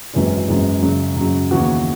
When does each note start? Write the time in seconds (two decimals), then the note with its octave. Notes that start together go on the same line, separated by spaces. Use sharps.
0.14 G#1 F#2 E3 G#3 C#4
0.48 G#1 F#2 E3 G#3 C#4
0.82 F#2 C#3 F#3
1.16 F#2 C#3 F#3
1.51 D#2 C#3 E3 B3 F#4